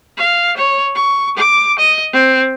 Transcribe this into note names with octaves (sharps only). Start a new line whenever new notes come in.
F5
C#5
C#6
D6
D#5
C4